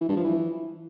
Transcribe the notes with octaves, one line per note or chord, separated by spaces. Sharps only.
E3
G2
F3
E3